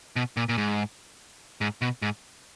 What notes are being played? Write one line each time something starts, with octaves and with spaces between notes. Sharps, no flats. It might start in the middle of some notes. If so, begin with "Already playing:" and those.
B2
A#2
A#2
G#2
G#2
B2
G#2